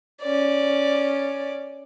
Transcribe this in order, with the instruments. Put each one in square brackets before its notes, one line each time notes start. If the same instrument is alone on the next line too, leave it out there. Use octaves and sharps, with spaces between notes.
[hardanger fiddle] C#4 D5